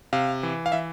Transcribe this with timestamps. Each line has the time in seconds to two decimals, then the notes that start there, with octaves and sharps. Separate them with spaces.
0.13 C3 F5
0.43 E3
0.66 F5
0.72 E3 E5